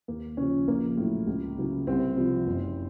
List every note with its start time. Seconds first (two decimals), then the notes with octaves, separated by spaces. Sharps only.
0.08 D#2 A#3
0.37 C#3 C#4
0.42 F3
0.68 A#1 A#3
0.97 A2 F#3
1.27 C#2
1.57 C#3 F#3
1.87 C2 C4
2.16 C3 F3
2.47 F#1